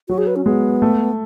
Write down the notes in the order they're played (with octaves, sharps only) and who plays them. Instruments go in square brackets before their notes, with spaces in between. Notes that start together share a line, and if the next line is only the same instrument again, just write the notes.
[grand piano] F#3 [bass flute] F#4
[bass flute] G#4
B4
C#4
[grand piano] G#3 [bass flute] B3
[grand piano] A3